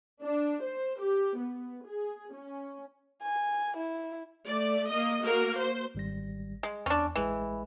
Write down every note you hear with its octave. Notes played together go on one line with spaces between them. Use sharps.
D4
C5
G4
B3
G#4
C#4
G#5
E4
A3 D5
A#3 D#5
A#3 F#4 A#4
C5
G#1 G3 A#6
G#3
E2 C#4 D4
A1 E3 G#3